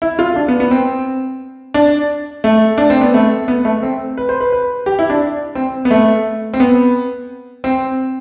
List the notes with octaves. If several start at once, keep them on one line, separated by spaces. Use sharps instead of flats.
E4
F4
D4
B3
B3
C4
D4
A3
D4
C4
B3
A3
B3
A3
C4
B4
C5
B4
B4
G4
E4
D4
C4
B3
A3
C4
B3
C4